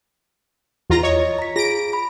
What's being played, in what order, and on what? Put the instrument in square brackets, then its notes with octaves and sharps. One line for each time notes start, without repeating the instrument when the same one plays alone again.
[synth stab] E2 F4 A#5
[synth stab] C#5 [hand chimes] D#5
[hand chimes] A#5 B6
[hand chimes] F4 G#4 [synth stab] A#6 D7
[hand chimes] B5